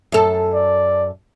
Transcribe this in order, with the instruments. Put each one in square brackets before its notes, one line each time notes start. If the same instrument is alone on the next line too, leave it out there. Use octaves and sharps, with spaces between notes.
[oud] F#2 A4
[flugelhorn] D5